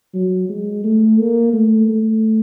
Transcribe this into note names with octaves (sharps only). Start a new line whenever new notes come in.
F#3
G#3
A3
A#3
A3
A3